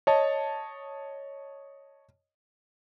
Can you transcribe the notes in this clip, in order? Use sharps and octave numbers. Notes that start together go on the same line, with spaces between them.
C#5 D#5 A5